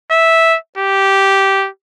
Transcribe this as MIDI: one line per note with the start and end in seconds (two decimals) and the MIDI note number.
0.11 0.57 76
0.78 1.69 67